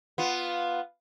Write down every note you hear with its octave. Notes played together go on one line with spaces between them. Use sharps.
B3 F4